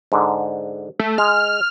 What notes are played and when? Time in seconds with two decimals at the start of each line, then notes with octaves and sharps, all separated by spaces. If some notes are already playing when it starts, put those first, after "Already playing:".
0.12 G#2 D3
0.99 A3
1.18 G#3 F6